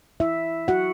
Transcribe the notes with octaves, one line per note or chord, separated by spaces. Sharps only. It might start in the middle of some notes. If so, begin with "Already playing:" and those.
E4 E5
F#4 F#5